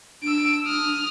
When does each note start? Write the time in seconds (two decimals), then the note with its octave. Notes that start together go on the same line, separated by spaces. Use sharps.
0.23 D4 E6 D7
0.67 D#6 F6